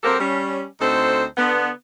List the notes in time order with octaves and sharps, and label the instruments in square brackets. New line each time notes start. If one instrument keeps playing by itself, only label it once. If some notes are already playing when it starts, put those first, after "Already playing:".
[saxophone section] F#3 C4 G4 A4 A#4 C5
G3 C#4
D2 C4 D#4 A4 C5
D3 B3